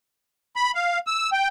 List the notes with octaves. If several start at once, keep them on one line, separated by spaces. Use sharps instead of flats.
B5
F5
E6
G5